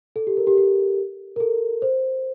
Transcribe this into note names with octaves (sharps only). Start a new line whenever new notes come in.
A4
G4
A#4
G4
G4
A#4
A4
C5